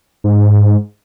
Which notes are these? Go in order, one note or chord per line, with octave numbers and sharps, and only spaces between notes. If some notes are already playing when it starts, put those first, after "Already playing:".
G#2